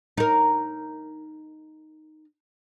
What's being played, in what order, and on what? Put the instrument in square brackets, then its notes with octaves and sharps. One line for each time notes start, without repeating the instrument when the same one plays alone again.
[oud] D#4 A#4